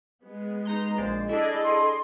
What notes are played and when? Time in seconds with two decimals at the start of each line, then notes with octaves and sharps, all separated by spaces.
0.22 G#3 B3
0.65 D#4 A#5 C6
0.98 A#1 G#3 C5 D5
1.29 D4 E4 G#4 A4 D5 D#5
1.64 C6